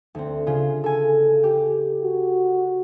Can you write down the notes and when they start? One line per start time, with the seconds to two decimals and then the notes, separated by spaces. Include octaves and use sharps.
0.15 D2 C4
0.47 C#3 F4 G#4
0.84 A4 G#5
1.43 G4
2.04 F#4